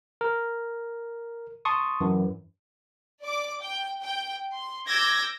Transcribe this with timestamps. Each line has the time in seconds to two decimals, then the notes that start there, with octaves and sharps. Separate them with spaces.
0.21 A#4
1.65 A5 C6 C#6 D#6
2.01 F#2 E3
3.22 D5 D6
3.61 G5
4.02 G5
4.54 C6
4.87 D6 E6 G6 G#6 A#6